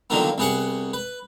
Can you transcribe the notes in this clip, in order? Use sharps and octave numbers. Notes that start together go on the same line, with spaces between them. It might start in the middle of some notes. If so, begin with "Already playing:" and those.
D3 D#3 F3 F#3 A#3 B3
C2 B3 G#4 F#5 C#6
B4